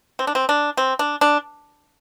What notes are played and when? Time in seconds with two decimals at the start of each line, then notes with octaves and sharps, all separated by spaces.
0.19 C4
0.27 D4
0.35 C4
0.49 D4
0.77 C4
0.99 D4
1.21 D4